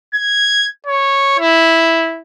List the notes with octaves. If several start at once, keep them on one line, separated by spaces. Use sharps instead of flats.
G#6
C#5
E4